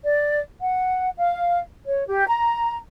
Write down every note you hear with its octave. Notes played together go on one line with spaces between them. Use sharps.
D5
F#5
F5
C#5
G4
A#5